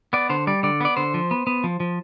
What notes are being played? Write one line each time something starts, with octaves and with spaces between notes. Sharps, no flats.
B3 D5
D3 C5
G3 D5
D3 D5
B3 D5
D3 C5
F3
B3
B3
F3
F3